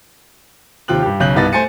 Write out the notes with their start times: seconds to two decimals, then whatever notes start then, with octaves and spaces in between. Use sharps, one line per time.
0.88 D#2 C3 F4 G5 F#6 F#7
1.03 G2 G4
1.20 B1 C#3 F#6 G6 F#7
1.35 C2 G2 B3 D#4 A6 A#6
1.52 A3 C5 G#5 A6 C#7 D#7